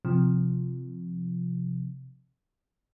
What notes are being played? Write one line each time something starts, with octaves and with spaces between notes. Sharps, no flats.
C3 F3